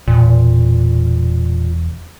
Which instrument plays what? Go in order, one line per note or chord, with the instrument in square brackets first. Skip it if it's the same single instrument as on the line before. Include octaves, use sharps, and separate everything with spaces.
[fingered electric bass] E1 [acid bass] A#2